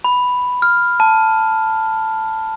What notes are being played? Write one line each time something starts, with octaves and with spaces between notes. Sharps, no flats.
B5
F6
A5